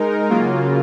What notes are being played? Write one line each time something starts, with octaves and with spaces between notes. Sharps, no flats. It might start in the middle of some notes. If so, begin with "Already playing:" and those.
Already playing: G#3 D#4 A#4
C#3 F#3 A#3 F4